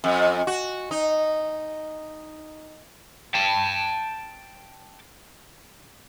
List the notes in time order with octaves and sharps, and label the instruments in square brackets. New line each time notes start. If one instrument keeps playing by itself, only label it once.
[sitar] F2
F#4
D#4
[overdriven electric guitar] G5 A5